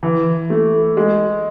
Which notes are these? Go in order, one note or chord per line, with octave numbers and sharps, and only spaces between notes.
E3
A3
G#3